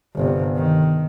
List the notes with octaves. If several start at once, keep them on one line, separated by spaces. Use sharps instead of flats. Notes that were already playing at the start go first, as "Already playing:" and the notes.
G1 C3
D#3